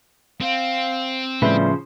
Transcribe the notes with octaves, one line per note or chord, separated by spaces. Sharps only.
C4 F5
A2 C#3 F3 G3 B4 C5 E5